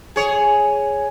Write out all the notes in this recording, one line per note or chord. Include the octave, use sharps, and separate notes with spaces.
G#4 C#5